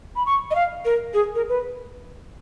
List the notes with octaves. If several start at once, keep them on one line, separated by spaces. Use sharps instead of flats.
B5
C#6
D#5
F5
A#4
G#4
A#4
B4